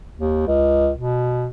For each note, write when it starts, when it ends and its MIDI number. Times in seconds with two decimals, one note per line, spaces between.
0.18 0.45 39
0.47 0.91 37
0.96 1.48 47